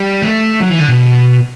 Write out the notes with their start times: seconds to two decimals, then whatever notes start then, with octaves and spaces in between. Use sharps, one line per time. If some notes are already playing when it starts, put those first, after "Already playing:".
Already playing: G3
0.22 A3
0.60 F#3
0.70 E3
0.79 D3
0.88 B2